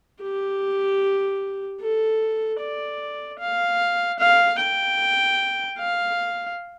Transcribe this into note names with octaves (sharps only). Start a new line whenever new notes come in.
G4
A4
D5
F5
F5
G5
F5